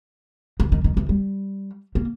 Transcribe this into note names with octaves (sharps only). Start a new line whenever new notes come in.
E3
D#3
D#3
E3
G3
A#3